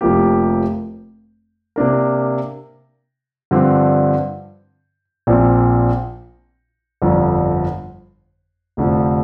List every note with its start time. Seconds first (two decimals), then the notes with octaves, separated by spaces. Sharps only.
0.01 F1 F2 F3 A#3 G4
1.76 C3 A#3 D4 A#4
3.51 G2 D3 F3 C4
5.27 A#1 A#2 F3 C4
7.02 G1 F2 D3 F3
8.77 F1 F2 D3 F3